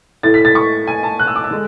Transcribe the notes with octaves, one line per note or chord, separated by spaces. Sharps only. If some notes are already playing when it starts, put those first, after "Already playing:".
A2 E3 A3 A6
B6
A6
C#6
G#5
A5
F#6
E6
D6
E6
D3 G#3